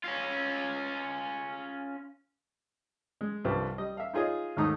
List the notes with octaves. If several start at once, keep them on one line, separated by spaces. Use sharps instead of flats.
C#4 F4
G#3
C2 G2 F3 B4
G3 D#5
E5 F5
D#4 F4 G#4 C#5 D#5
D#2 G#2 A3 D#4 D#6